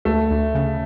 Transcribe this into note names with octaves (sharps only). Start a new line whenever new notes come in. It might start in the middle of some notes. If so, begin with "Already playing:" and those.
D2 A3
D2
C#3